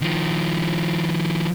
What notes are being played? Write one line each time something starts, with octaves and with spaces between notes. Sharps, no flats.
D#3 F3